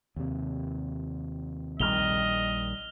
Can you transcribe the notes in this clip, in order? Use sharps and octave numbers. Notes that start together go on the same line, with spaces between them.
D#2 C3
A#1 D#3 G3 D#5 F6 F7 G7